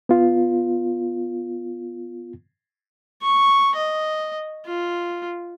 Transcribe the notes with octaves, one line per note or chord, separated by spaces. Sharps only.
B3 F4
C#6
D#5
F4